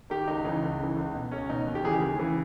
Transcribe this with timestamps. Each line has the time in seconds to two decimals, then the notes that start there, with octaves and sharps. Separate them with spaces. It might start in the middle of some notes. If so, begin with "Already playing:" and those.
0.10 D#3 G4
0.27 C#2 D#4
0.45 C#3 E3 D#4
0.62 C#2
0.79 C#3 E3
0.97 C#2
1.15 B2
1.31 C#2 C#4
1.49 B2 D#4
1.67 D#2
1.75 G4
1.84 C#3 E3 G#4
1.92 G4
2.01 D#2 G#4
2.19 C#3 E3